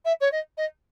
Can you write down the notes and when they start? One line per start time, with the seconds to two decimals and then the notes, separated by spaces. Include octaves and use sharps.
0.05 E5
0.20 C#5
0.32 D#5
0.57 D#5